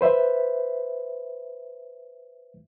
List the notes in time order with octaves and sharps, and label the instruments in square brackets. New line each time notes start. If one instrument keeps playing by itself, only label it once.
[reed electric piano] B4 C5 E5